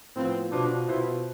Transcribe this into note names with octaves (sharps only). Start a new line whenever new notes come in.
A2 F3 B3 C4
B2 B3 D4 F4 C5
B2 B3 E4 F4 C5